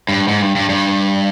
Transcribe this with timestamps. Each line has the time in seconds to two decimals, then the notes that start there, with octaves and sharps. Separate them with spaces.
0.09 G2
0.28 G#2
0.42 G2
0.56 G2
0.69 G2